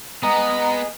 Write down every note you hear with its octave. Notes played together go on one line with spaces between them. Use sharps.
B3 G#4 D#5 A#5